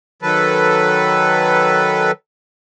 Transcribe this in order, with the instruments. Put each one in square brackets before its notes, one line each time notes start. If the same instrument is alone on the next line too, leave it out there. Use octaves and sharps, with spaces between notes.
[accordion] D#3 F#3 A4 B4